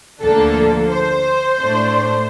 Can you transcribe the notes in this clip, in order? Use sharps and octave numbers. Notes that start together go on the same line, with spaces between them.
D2 D3 F3 A#3 D4 A4
C5
A2 A3 D4